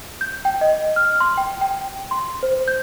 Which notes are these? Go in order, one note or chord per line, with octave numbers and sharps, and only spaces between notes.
G6
G5
D#5
F6
C6
G5
G5
C6
C5
G6